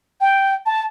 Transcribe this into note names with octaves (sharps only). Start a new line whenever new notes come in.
G5
A5